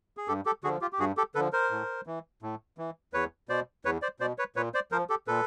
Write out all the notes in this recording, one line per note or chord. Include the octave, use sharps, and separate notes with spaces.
G#4
G2 G4 A4
G4 A4
D3 F3 F#4 G#4
F4 G4
G4
G2 F#4 G#4
G4 A4
D3 F3 A4 B4
A#4 C5
A2
E3
A2
E3
E2 B4 C#5
B2 C5 D5
E2 B4 C#5
C5 D5
B2 C5 D5
B4 C#5
A#2 B4 C#5
C5 D5
F3 A#4 C5
G4 A4
A#2 A4 B4